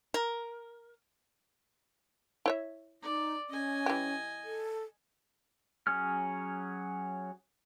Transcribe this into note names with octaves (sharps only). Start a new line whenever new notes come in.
A#4
E4 C#5 E5
D#4 D5
C#4 D#5 G#5
E3 G4
A4
F#3 C#4 G#4 C#5 F6